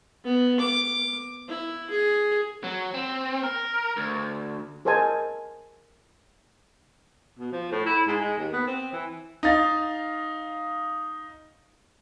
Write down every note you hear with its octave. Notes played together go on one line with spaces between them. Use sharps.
B3
D6
E4
G#4
F#3
C4
A#4
D2
G#4 A#4 C5 D#5 G#5 A5
B2
F3
A2
E4
G#2
G#3
D#2
B3
C4
E3
D#4 F5 A6